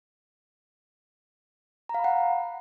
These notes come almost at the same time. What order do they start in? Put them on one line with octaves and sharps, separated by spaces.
A#5 F5 B5 F#5